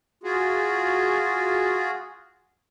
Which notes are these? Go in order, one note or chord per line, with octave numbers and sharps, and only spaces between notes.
F4 F#4 G#4